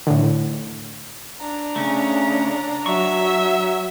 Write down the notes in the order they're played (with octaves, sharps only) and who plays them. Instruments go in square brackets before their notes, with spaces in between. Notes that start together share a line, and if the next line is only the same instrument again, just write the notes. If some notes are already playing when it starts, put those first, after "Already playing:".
[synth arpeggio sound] A2 D3
[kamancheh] D4 A#5
[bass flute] C#3 [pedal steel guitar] A3 C#4
[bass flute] F#3 [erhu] E5 [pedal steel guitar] C#6